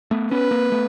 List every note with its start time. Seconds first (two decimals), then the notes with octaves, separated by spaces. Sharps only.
0.11 A3 B3
0.31 B3 C#4 B4
0.51 A#3 C4
0.72 A3 B3